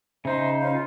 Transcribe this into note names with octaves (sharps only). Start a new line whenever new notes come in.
C#3 D#4 C5 E5
C#4 C5 F5
F4